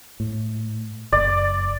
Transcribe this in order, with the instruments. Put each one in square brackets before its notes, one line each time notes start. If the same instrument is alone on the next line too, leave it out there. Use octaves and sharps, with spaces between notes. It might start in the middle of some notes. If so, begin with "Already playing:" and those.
[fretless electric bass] A2
[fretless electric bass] F#1 [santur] D5